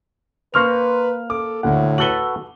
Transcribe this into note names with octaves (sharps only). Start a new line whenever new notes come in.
A#3 B4 C5 A#5 C#6 F6 F7
A4 D6
D2 A2 F#5
F#4 A4 B4 F#7 G7